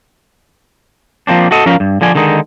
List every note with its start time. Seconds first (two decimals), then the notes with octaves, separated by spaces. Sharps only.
1.27 F3 A#3 C4 D4
1.51 F#4 A4 D#5
1.66 F3 C#4 A#4 F5
1.80 G2
2.01 D3 F3 D5 G#5
2.15 D3 D#3 G#3 D#4